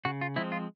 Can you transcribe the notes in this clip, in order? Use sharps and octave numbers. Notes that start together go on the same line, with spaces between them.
C#3 F#4
F4
F3 G#3 C4 E4
F4